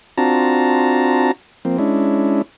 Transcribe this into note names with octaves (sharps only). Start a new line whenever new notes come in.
C4 D4 F4 F#4 A5 A#5
F3 A#3 C4
G#3 C#4 D4 E4